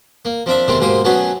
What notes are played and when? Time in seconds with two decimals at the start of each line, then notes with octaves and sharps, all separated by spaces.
0.25 A#3
0.46 F3 C4 D4 E5
0.68 E2 C3 D#3 A3 C4 D#4
0.80 G#2 B2 A#3 G4 C5 D#6
1.04 F#3 A3 B3 C#4 F#4 G#4